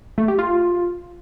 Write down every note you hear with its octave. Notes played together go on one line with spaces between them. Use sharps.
A3
G4
F4